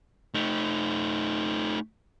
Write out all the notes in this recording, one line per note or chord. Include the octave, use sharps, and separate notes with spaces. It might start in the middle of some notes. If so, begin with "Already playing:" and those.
A3 D#4